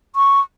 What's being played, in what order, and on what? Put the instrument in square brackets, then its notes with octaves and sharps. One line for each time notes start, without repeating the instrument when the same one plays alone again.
[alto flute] C#6